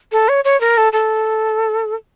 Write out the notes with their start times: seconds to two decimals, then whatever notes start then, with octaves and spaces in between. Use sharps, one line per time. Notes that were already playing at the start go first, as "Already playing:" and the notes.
0.12 A4
0.29 C#5
0.44 C#5
0.61 A#4
0.78 A4
0.93 A4